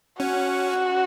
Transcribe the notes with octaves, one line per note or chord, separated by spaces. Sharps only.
C#4 F#4